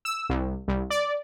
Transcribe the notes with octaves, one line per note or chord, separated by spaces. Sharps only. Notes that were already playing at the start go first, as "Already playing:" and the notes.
E6
C2
C2
D5